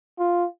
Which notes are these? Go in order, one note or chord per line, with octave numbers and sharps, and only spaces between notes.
F4